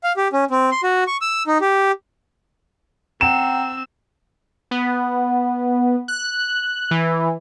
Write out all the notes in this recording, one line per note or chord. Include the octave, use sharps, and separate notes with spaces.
F5
G4
C#4
C4
C6
F#4
C#6
E6
D#4
G4
C4 F#5 G5 A#5 E6 E7
B3
F#6
E3